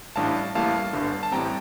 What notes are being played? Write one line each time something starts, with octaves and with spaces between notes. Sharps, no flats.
A1 A2 G3 D4 F5 A5
A1 A2 G3 A#3 F5 A5
G1 G2 D3
A5
A1 A2 G3 C4 G5 A#5